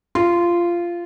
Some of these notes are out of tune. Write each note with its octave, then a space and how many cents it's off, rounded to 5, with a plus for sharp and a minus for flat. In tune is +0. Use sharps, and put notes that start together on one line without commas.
F4 -15